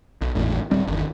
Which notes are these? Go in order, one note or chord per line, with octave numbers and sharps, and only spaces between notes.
B1
G#1 E2 A2
D1 G3 C4
G1 D#2